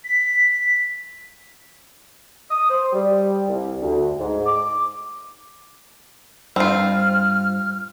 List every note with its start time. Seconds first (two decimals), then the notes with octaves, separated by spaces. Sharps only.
0.05 B6
2.50 D#6
2.70 C5
2.93 G3
3.49 C2
3.81 D2
4.19 G#2
4.46 D6
6.56 G2 C4 F4 F6